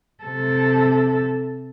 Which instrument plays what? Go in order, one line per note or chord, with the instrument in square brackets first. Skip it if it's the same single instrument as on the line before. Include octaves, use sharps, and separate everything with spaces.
[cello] C3 A4